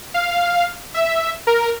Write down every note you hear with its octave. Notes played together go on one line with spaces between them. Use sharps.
F5
E5
A#4